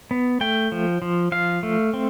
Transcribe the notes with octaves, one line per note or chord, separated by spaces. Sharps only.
B3
A3 G5
F3
F3
F3 F5
A3
C4